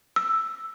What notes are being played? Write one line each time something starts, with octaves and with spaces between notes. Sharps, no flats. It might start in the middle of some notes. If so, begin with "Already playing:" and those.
E6